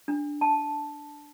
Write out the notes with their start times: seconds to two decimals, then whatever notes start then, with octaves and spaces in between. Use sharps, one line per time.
0.08 D4
0.41 A5